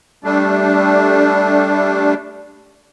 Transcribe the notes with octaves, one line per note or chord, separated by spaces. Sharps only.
G3 A3 D4